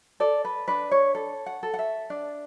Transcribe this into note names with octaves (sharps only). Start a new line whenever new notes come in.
A4 D5
B4
D4 B4
C#5
A4
F#5
A4
F#5
E5
D4